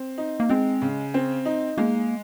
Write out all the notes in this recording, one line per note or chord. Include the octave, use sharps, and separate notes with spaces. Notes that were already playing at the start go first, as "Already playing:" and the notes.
Already playing: C4
D#4
A#3
G#3 C4
C#3
C4
D#4
G#3 A#3